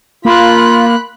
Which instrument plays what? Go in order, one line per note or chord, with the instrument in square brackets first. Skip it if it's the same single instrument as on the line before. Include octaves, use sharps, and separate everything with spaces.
[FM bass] A#3 [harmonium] F4 [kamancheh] B5 F#6